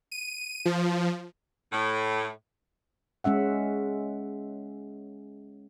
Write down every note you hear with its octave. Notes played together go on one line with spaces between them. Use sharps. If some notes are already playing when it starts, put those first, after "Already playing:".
D#7
F3
A2
G#3 C#4 E5 F#5